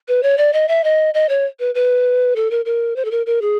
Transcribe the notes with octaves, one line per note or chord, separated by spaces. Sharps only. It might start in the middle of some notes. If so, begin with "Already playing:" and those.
B4
C#5
D5
D#5
E5
D#5
D#5
C#5
B4
B4
A4
A#4
A#4
C5
A4
A#4
A#4
G#4